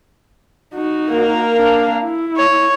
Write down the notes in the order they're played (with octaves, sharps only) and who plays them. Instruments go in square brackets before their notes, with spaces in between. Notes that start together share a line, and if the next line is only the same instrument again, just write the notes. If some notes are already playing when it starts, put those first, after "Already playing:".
[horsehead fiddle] D#4 F#4
[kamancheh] A#3 A#4
[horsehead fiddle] D4 F5
E4
[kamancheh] C#5